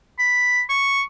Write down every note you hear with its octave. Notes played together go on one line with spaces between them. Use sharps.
B5
C#6